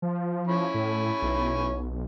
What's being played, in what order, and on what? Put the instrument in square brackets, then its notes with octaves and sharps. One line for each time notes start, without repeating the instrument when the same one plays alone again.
[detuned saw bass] F3
[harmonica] C#4 E4 B5
[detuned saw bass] A2
B1